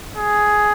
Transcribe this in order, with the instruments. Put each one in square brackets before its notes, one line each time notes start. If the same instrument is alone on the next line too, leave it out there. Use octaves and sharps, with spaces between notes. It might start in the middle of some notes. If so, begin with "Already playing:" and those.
[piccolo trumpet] G#4